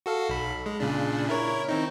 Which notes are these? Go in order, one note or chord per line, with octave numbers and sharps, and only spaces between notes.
F#4 A4 F5
B1 B5
G#3
A#2 C#3 D4
E4 A#4 C#5
D#3 C4 D#4